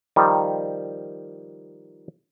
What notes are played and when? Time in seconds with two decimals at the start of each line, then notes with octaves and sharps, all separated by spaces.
0.16 D#3 F3 G3